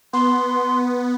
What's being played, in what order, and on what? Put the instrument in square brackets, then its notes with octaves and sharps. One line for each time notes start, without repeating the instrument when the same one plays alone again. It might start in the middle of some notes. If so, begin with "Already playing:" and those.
[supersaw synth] B3 [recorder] C6